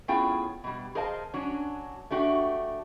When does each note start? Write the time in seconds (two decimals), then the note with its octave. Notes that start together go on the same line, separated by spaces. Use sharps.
0.08 A2 B3 C#4 F4 G#4 G5
0.64 B2 G3
0.95 G#4 A#4 C5 D#5 F5 A5
1.34 F#3 C#4 D4
2.11 A3 D4 F#4 G4